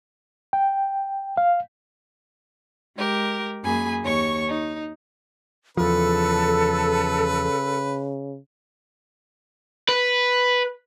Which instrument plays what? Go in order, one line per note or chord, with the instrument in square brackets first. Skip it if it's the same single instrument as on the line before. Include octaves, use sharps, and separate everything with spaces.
[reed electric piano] G5
F5
[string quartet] G#3 G4 A#4
F#2 A#3 G#4 G#5 B5
D#2 C#5 C#6
D#4
[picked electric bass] E2 F3 [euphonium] C#3 [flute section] A4 [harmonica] B4
[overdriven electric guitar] B4